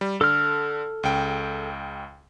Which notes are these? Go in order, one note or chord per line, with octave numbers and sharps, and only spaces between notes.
G3
D3 A4 F6
C#2 C#3 G5